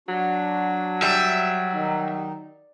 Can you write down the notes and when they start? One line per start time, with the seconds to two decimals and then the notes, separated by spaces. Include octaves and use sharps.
0.08 F#3 D4 F#4
1.02 G3 E5
1.73 D#3 D#4